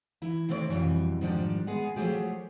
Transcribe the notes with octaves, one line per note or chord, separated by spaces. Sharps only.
E3 E4
D#3 A3 C4 A#4 C#5 D5
F2 G#2 B2 E3 G3
G#2 D#3 F3 G3 D4
G#3 B3 G#4
F3 F#3 A3 G4 G#4